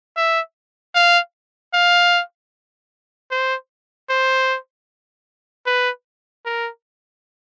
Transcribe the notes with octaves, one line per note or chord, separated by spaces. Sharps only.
E5
F5
F5
C5
C5
B4
A#4